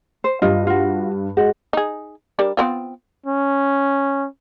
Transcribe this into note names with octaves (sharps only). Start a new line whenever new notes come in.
C5
G2 F4 D#5
F4 F#4
G#3 F#4
D#4 G#4
G3 D4 A#4
B3 C4 F4
C#4